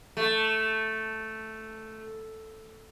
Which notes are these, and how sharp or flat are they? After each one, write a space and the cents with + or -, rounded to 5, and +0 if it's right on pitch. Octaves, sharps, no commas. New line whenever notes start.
A3 +0